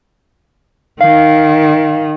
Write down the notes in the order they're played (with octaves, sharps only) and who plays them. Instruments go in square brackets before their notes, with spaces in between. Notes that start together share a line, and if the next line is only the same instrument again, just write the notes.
[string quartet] D#3 [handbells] F5